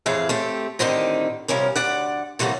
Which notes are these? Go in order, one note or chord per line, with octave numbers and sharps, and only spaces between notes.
F2 A2 E3 G#4 E5 F5
A3 C4 G4
A2 D3 D#3 C4 D#4 G4
C3 F3 G3 C#4 A#4
D2 D5 F#5
C3 E3 F#3 A3 A#3